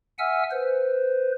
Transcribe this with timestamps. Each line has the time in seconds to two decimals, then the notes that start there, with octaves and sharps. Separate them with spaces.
0.19 E5 F#5 G#5 E6 F6
0.51 B4 C5